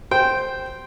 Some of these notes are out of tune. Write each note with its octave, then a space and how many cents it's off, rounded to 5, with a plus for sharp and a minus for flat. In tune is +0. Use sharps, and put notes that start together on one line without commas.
C5 +0 G5 -10